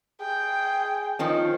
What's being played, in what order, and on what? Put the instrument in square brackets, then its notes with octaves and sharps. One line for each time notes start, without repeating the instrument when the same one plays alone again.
[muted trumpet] G#4 [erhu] G5
[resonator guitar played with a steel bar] D#3 F3 C#4